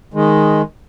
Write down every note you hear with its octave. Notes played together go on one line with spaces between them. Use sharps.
D#3 G#3